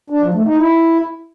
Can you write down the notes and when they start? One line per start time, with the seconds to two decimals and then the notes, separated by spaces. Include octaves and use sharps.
0.10 D4
0.22 F3
0.34 A3
0.46 D#4
0.57 E4